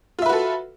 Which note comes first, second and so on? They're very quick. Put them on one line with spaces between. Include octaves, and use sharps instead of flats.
F4 E5 B4 F#4 A4